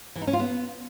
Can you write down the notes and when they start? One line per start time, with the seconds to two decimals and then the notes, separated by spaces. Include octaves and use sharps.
0.16 E3
0.21 D#4
0.27 C#4
0.33 F4
0.39 B3